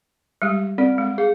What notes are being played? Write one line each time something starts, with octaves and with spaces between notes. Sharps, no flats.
G3 G#3 G4
C4 D5
G#3
G#4 F5